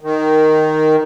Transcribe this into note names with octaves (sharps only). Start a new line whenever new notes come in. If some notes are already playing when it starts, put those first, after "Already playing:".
D#3